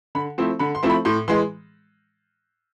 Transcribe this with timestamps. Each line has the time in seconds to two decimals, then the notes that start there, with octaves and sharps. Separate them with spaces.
0.15 D3 B5
0.38 F3 A3 C4 E4
0.59 D3 B5
0.75 C6
0.83 F3 A3 C4 E4
0.90 B5
1.05 A2 C6
1.28 E3 G#3 C6